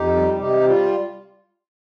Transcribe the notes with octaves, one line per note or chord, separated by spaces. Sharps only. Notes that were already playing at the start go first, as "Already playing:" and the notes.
Already playing: F2 D#4 G4
G3
C3 D#4 G4
G3
F4